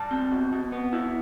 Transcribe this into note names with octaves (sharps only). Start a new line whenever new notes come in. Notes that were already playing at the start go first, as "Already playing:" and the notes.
Already playing: G3 A5
C4
B2
B2
B3
E4